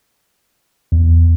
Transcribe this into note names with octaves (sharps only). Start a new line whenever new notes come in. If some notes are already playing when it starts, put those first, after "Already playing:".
E2